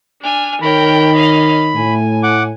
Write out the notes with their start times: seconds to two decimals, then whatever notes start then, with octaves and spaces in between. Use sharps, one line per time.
0.22 D4 G#5 F6
0.62 D#3 A#4 C#5 G5 B5
1.13 C#5 D#5 F5
1.76 A2 G#5
2.23 F#5 D6